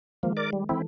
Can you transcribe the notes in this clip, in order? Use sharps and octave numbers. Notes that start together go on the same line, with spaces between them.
D#3 F3 G#3 A#3
A#4 D5 D6
G3
E3 C4 E4 A4